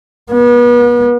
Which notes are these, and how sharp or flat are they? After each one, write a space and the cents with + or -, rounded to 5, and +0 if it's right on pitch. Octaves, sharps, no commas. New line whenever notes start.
B3 -35